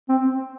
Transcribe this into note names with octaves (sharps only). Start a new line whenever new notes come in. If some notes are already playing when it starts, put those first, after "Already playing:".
C4